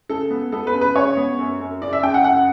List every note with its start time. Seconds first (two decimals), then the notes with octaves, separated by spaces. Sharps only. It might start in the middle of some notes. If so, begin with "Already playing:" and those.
0.09 C#3 A4
0.30 B3
0.52 B3 A4
0.67 B4
0.74 C#3
0.81 B4
0.96 C#3 C#5
1.17 B3
1.39 F#2
1.60 F#2
1.82 C#3 D5
1.93 E5
2.03 C#3 G5
2.14 F#5
2.24 F#2 F#5